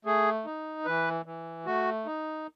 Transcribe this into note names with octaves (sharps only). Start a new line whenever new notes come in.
A3 G#4
D#4
E3 B4
E3
A3 F#4
D#4